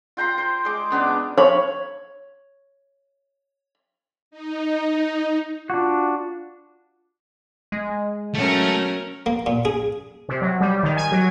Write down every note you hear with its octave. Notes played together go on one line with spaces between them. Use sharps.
F4 G5 A#5 C6
C5
G#3 D6
C#3 B3 D4 D6
C#5 B5
D#4
D4 F4 F#4
G#3
F#3 A3 C#4 A#4
A#3
A#2
G#4
C3
F#3
G3
D#3
G#5
F#3